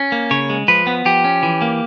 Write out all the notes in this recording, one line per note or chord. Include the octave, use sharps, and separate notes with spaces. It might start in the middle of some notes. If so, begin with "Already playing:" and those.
Already playing: C#4
A#3
C#3 C#5
G#3
F3 B4
B3
F3 G4
C#4
E3
A#3